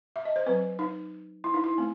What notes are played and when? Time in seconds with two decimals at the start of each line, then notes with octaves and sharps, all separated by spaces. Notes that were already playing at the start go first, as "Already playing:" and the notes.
0.16 E5
0.25 D#5
0.36 C5
0.46 F#3 C4 B4
0.79 D#4
1.44 E4
1.54 D#4
1.64 E4
1.78 A3 C4